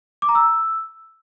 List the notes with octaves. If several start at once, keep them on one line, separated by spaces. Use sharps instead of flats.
D6
A#5
E6